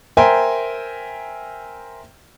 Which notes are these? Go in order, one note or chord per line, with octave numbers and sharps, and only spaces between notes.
A#4 C5 E5 G5 G#5 A#5